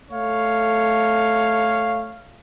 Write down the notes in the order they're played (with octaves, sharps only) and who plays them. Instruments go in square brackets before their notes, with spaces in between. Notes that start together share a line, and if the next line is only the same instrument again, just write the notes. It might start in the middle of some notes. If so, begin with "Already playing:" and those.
[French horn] A3 [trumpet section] C#5 F5